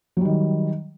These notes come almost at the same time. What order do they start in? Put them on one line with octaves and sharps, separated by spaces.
F#3 G3 D#3